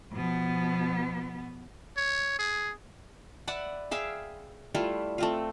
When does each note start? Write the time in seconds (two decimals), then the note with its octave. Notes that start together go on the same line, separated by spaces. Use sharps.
0.13 B2 F3 B3
1.97 C#5
2.38 G#4
3.48 B4 D5 E5 F#5
3.91 G#4 E5 F5 G5
4.74 G3 A3 E4 F4
5.18 A3 C4 F4